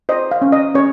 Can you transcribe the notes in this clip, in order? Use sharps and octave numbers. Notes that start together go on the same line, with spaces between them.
C5 D#5
F5
C#4
D#5
C#4 C#5